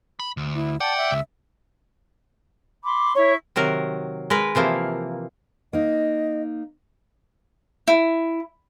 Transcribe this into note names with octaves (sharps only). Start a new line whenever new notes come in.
B5
D2
E4
D5 F#5 G5 A5
E5
C#2
B5 C6 D6
E4 C#5 C#6
C3 D#3 F#3 A#4
G#3 A#4 B4
C3 E3 F3 A#3
A#3 D#4 D#5
E4